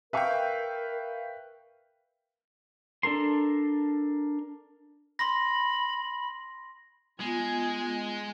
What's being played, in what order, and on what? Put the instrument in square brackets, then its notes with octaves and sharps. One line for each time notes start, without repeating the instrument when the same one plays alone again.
[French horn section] A#4 [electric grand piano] B4 G5 [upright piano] E5 F5 C#6
[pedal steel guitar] D4 A4 A#4 C6
[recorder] B5 [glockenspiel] C6 A#6
[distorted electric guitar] G#3 [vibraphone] B3 F4 [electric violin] G#5 G#6